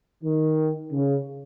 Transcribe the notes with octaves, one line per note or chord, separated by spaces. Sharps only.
D#3
C#3